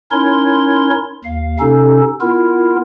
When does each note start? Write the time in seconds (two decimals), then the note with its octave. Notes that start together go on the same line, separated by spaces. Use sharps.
0.12 C#4 D#4 E4 A#4 C#5 C6
1.25 D#2 F5
1.60 C3 C#4 D#4 A4
2.21 B3 E4 F4 A#4